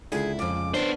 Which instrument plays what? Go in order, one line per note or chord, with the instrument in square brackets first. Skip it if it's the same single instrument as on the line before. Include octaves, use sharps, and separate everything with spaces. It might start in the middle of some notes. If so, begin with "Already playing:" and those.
[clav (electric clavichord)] C#2 D3 [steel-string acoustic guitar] E4 [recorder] G#4
[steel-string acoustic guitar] F2 C#3 [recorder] D6
[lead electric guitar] B3 C5 [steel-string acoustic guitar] C#4 D4 B4